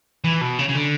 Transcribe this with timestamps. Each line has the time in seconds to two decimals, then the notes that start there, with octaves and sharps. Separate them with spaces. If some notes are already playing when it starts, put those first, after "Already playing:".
0.24 E3
0.41 B2
0.59 C#3
0.69 C#3
0.76 D3